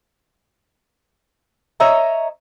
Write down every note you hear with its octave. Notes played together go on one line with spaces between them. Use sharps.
C#5 D#5 E5 A#5